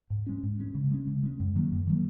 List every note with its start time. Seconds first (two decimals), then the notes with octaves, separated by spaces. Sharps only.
0.10 G#2
0.27 G#3 C#4
0.43 G#2
0.60 G#3 C#4
0.75 C#3
0.91 G#3 C#4
1.07 C#3
1.23 G#3 C#4
1.40 F#2
1.56 D#3 F#3 A#3
1.72 F#2
1.87 D#3 F#3 A#3